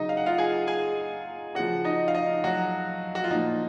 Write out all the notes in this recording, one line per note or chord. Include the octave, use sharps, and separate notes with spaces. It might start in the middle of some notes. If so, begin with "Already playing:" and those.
Already playing: C#3 F#3 D#4 D#5
F5
F#5
F4 F5
G#4 G#5
G#4 G#5
C#3 F3 F#4 F#5
D#4 D#5
F5
D#4 D#5
F#3 F#4
F#4
F4
A#2 F3 D#4